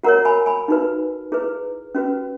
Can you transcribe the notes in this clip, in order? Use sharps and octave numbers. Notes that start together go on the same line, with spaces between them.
F#4 A#4 C#5 F#5 A#5
G#5 B5
G#5 B5
D#4 F#4 B4
E4 G#4 B4
C#4 F#4 B4